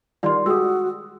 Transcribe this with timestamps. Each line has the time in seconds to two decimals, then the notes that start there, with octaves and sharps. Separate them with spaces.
0.23 D#3 G3 F4 D5 C6
0.46 G#3 F#4 G4 D#6 E6